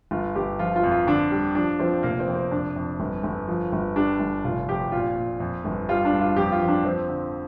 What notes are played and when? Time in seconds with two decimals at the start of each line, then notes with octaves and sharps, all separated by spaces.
0.11 G1 F4
0.36 G1 G4
0.59 F3 F4
0.76 F4
0.83 F2
0.92 F4
1.07 D3 D4
1.31 G3
1.55 F3 D4
1.79 F3 C4
2.03 F1 A#3
2.19 C4
2.27 F2
2.35 C4
2.51 F2 D4
2.76 F2
3.00 G1
3.23 G1
3.48 F3
3.72 G1
3.96 G3 D4
4.20 G1
4.44 F1 F4
4.68 F2 G4
4.92 A#2 F4
5.16 A#2
5.40 F2
5.65 G1
5.89 G3 F4
6.05 D4
6.12 G2
6.21 F4
6.36 F2 G4
6.52 F4
6.61 F3
6.68 D4
6.84 F3 C4
7.09 D3